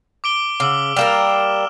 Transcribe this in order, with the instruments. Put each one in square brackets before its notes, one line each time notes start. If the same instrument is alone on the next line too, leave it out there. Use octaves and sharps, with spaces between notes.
[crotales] D6 D7 G7
[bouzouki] C#3 [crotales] D6 E6 F#7
[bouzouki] G3 A#3 A#4 [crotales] F6 E7